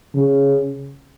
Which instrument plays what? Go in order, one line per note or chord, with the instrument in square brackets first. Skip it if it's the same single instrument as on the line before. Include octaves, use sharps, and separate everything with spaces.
[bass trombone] C#3